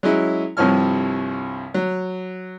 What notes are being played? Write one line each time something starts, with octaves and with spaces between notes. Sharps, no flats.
F#3 G#3 C#4 E4
C2 G2 C3 F3 C#5 F6
F#3